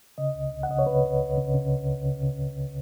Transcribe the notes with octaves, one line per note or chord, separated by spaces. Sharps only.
C#3 D#5
C#2
C#2
F#5
C#3 D#5
C#5
C#3 B4
C#2
C#2
C#3
C#3
C#2
C#2
C#3
C#3
C#2